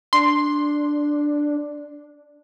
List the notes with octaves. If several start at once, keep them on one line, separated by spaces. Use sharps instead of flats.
D4 C6